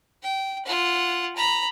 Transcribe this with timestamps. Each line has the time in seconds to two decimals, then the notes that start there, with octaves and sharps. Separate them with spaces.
0.22 G5
0.65 F4 F#5
1.36 A#5 B5